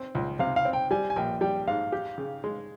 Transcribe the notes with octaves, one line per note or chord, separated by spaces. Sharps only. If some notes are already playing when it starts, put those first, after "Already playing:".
Already playing: C4
C#2
C3 F5
F5
C4
G5
G3 G#5
G#5
A#1 G5
G3 G5
G#2 F5
G4
C#3
G#3